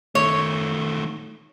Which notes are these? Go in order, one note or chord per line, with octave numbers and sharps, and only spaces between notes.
D#3 A3 C#5